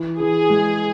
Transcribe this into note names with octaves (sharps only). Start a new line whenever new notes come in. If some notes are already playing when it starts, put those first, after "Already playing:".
Already playing: E3
E3 G#4
G#3